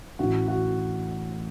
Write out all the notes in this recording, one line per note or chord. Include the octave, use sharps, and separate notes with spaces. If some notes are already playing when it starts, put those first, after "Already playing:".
A1 A2 E3 F#4
F#4